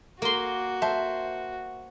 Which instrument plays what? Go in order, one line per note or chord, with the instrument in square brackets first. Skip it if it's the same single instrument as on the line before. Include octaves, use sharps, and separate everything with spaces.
[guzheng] A#3 C6 [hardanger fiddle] F#4
[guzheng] C5 [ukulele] E5 A5